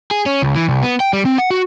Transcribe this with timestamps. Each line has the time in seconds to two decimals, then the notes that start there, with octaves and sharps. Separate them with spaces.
0.11 G#4
0.26 C#4
0.42 C#2
0.55 E3
0.69 C2
0.83 B3
1.00 G5
1.13 G3
1.25 C4
1.38 F#5
1.51 F#4